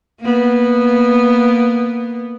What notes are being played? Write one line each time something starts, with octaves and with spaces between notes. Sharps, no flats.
A#3 B3